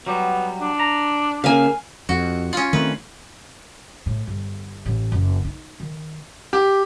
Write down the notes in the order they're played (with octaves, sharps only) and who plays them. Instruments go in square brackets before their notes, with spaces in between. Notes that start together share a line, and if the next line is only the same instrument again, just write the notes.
[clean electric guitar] F#3 G3 [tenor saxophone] B3
[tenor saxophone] D4
[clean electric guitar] A#5
[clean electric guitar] C#3 A#3 [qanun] F5 G#5
[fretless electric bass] F2 [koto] F#4
[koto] C#4 F4
[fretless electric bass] D#3 A3 C4 [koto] B4
[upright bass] A2
G1
A1
F#1
D#4
D#3
[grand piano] G4